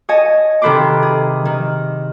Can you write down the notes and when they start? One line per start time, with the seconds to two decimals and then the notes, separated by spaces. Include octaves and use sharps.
0.09 C#5 D#5 G#5 A5
0.62 C3 D#3 A4 B4 C5 D6
1.02 G#4
1.45 D#3